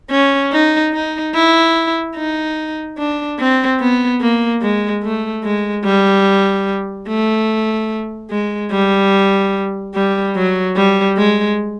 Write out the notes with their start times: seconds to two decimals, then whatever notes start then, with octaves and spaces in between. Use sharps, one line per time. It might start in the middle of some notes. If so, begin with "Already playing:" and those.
0.11 C#4
0.52 D#4
0.93 D#4
1.34 E4
2.16 D#4
2.98 D4
3.39 C4
3.80 B3
4.21 A#3
4.62 G#3
5.03 A3
5.44 G#3
5.85 G3
7.08 A3
8.31 G#3
8.71 G3
9.95 G3
10.36 F#3
10.77 G3
11.17 G#3